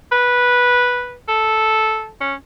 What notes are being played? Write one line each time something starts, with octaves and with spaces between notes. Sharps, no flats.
B4
A4
C#4